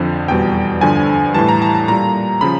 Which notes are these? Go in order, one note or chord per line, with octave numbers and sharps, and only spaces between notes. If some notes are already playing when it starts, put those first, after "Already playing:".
Already playing: F2 D3 F3
E2 B2 G3 G5
G2 D3 F3 G#5
A2 E3 G3 A5
A#5
A5
A5
A#2 G3 A#5
C#3 F3 B5